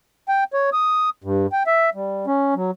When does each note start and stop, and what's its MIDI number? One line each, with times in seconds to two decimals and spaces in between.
0.29 0.44 79
0.53 0.70 73
0.73 1.10 87
1.24 1.47 43
1.52 1.63 79
1.67 1.90 76
1.95 2.26 55
2.27 2.54 61
2.56 2.71 54